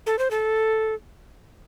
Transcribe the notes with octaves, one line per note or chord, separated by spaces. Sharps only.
A4
C5
A4